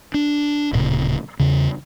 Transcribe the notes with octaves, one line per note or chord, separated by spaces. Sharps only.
D4
D1 A#2 C#3
E2 C#3